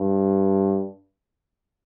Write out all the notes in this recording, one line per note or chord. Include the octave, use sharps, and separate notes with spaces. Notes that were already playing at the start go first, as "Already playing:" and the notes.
Already playing: G2